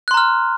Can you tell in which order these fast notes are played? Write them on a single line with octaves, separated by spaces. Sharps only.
F#6 C6 A#5 F6